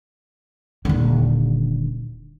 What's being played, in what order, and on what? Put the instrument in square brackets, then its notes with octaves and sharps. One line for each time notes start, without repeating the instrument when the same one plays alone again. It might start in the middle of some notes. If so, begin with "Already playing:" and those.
[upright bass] D#1 D3